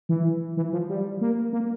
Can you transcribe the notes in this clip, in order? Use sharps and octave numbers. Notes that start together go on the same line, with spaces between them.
E3
E3
F3
G3
A#3
A#3